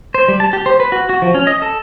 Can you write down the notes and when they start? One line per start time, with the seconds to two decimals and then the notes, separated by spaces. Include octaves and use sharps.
0.14 C5
0.28 G3
0.40 A5
0.53 G4
0.66 C5
0.80 B4
0.92 F#4
1.09 F#4
1.22 F3
1.35 C#4
1.47 D#5
1.62 A4